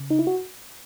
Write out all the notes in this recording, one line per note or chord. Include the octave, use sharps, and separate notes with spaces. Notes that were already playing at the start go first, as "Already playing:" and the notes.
Already playing: C#3
D#4
E4
F#4